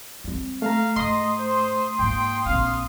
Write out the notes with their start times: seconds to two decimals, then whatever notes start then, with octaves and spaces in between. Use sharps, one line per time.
0.24 G3 C4
0.62 A3 F5 A#5
0.96 G#2 D#5 C6 D#6
1.39 C5
1.99 G#2 A#3 G5
2.46 A#1 C4 F5